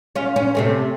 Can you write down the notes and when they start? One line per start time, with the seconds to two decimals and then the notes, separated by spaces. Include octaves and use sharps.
0.16 C#4 F4
0.36 C#4
0.55 C3 A3 C4